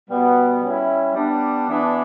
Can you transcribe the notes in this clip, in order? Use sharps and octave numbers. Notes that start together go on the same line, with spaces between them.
B2 G3 B3
G3 C#4 E4
G3 B3 D4
E3 B3 D4